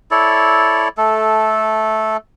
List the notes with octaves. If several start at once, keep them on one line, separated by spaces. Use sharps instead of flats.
E4 A4 C#5 D5
A3 A4